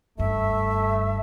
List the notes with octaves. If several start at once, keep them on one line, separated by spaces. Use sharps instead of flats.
F#1 G2 A3 E5